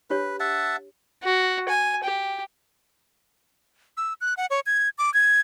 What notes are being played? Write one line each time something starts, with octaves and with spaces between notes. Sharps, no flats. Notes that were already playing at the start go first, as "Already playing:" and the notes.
D4 G4 B4 C#5
E5 F#5 A5
F#4
G#5
G4
E6
F#6
F#5
C#5
G#6
D6
G#6